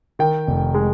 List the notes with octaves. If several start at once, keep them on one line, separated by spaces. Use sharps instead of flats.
D#3 G5
F1
G#3